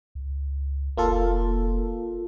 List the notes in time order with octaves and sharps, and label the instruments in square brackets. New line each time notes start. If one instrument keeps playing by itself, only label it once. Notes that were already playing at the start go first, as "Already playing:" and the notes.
[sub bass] C#2
[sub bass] F1 [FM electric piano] A#3 F4 A4